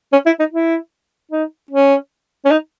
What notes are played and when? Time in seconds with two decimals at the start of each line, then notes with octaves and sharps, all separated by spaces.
0.13 C#4
0.26 E4
0.39 D#4
0.52 E4
1.32 D#4
1.71 C#4
2.45 C#4
2.51 D#4